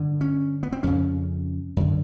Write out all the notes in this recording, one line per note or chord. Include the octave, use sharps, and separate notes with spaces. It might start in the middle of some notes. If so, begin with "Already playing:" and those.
Already playing: G2 D3
C#4
B3
C4
F2 C#3 C#4
F#2 D3